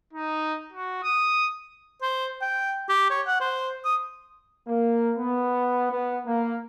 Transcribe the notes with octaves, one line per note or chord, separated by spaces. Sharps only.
D#4
F#4
D#6
C5
G5
G4
C#5
F#5
C5
D#6
A#3
B3
B3
A#3